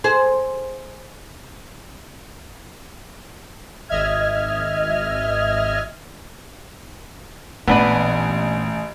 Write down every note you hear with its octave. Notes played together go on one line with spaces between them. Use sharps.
G#4 C5
G#1 D#5 E5 F6 G#6
A1 A#2 E3 B3 D4 B4